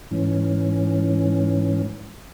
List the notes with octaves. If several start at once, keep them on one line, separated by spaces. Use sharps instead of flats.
G#2 E3 C#4